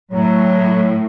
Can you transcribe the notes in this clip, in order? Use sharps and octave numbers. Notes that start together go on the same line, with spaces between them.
A2 F#3